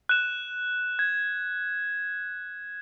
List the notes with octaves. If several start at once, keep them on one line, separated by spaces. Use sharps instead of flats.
F#6 E7
G#6